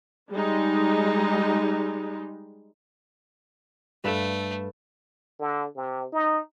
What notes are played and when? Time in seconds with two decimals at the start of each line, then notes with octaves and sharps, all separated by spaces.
0.31 G3 G#3 D#4
4.04 G2 A3 A4 B4 F5 E7
5.39 D3
5.76 C3
6.12 D#4